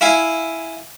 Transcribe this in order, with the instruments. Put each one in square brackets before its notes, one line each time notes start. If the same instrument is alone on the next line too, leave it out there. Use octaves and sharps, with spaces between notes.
[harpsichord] E4 F5 G#5